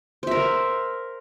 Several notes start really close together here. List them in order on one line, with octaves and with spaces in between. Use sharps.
C5 E5 A#4